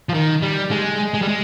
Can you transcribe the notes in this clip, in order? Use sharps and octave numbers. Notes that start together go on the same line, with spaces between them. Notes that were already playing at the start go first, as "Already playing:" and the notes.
F3
D#3
G3
G#3
G#3
G3
G#3